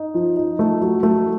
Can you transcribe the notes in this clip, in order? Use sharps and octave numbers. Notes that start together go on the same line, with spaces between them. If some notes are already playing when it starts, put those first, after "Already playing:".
Already playing: D#4
F3
D#4
A3
F#3
A3